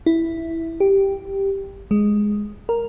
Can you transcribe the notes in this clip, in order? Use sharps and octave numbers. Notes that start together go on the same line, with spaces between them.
E4
G4
G#3
A#4